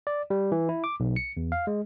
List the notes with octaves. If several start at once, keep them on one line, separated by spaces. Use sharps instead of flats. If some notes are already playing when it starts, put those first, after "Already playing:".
D5
G3
E3
E4
D6
B1
C#7
E2
F5
G#3